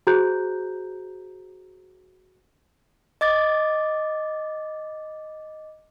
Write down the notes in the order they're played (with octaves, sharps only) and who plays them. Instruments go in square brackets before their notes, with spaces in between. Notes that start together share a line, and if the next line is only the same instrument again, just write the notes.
[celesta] F#4 G#4 C5 A#5 F#6 G6
[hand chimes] D#5 D6 A6